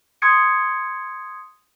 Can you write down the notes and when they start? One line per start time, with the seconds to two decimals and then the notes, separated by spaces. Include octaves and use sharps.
0.22 C6 D#6 G#6 C#7 D7